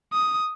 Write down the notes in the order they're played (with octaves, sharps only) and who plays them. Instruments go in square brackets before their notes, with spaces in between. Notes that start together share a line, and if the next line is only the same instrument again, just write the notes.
[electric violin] D#6